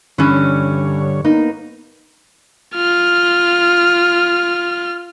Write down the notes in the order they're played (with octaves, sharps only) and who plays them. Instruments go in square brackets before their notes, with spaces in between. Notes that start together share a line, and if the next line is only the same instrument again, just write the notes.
[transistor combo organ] G2 D3 C#5 [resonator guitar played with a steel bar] E3 C#4
[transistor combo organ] A#3 B3 [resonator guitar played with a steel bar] D#4
[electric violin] F4 F6